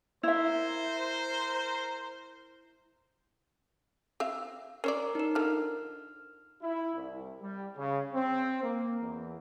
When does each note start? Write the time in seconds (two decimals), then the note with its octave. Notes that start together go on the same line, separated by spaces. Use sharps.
0.23 E4 A#4 C5 E5
4.20 C4 E5 F5
4.84 C#4 A#4 C#5 D5
5.15 D#4 A#4
5.35 D3 F3 F6
6.61 E4
6.95 C2
7.41 G3
7.76 C#3
8.13 C4
8.61 A#3
9.01 E2